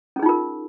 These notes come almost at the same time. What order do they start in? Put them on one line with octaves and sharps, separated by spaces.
C#4 G#4 D#4 F4 A#4